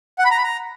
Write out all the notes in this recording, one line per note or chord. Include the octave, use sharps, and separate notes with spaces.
F#5
B5
A#5
B5
A#5